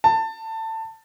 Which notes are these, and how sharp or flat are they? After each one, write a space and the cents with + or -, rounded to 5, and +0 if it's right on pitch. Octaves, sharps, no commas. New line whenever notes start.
A5 +20